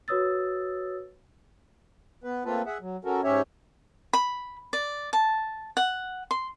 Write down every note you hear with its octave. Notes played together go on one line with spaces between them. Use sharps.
F#4 B4 C#5 D#6 E6 A6
B3 B4
A3 A#3 C4 F4 A4 B4
G#4 E5 F#5
F#3
C#4 F#4 A4 A#4
G#2 C#4 G4 C#5 E5
B5
D5
A5
F#5
C6